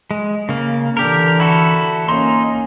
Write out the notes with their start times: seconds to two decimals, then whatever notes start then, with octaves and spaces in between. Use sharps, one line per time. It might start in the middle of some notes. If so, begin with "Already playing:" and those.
0.11 G#3
0.49 C#3 A#3
0.97 D3 E3 G4 A#4
1.40 E4 F#4 A4
2.09 A#3 C#4 D#4 C6